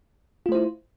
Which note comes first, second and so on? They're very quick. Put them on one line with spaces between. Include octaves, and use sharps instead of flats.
F4 A3 C5 E4